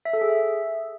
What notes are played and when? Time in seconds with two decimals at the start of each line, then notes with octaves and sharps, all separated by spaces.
0.05 E5
0.13 A4
0.21 G#4
0.29 E5